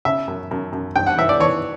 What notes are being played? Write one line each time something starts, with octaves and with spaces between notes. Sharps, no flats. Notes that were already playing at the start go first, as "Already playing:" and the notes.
C#3 E5
F#2
F#2
F#2
G2 G5
F#5
E3 E5
D5
E3 C#5